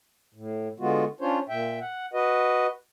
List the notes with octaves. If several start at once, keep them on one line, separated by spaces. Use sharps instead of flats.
A2
D3 G#3 B3 F4 F#4
C#4 D4 F4 C5 C#5
A#2 E5 G5
F#5
F#4 B4 D#5